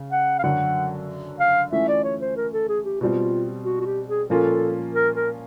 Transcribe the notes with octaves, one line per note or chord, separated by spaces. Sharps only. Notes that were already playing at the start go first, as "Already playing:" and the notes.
Already playing: C#3
F#5
F5
F#2 D3 F#3 F#5
F5
E3 A3 C#4 F4 E5
D5
C#5
C5
A#4
A4
G#4
G4
B2 G3 C4 F4
F#4
F#4
G4
G#4
A#2 F3 A#3 C#4 F4 A4
A#4
A#4